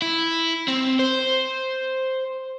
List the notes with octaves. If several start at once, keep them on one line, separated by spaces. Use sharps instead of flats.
E4
C4
C5